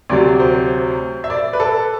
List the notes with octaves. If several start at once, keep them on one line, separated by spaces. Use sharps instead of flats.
D2 C3 F#3 D5
C5
E5
D5
B4
A4